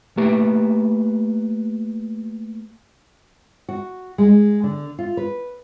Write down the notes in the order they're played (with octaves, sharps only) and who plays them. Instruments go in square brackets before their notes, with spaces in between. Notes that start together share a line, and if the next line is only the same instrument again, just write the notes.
[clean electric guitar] A3 A#3 G4 B4
[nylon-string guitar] F#4
G#3
D3
F4
B4